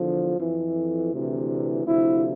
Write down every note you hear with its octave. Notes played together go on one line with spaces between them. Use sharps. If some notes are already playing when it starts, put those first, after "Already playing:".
Already playing: E2 D3 F3
F2 E3
D2 C3 E3
D2 C3 F3 E4